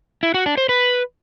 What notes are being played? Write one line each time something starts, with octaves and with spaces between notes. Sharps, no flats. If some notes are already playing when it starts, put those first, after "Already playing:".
E4
F#4
D4
C5
B4